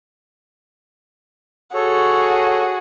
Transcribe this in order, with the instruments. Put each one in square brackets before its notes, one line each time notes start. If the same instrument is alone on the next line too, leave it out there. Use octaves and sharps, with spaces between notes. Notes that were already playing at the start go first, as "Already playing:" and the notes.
[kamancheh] F#4 G#4 [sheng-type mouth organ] A4 C#5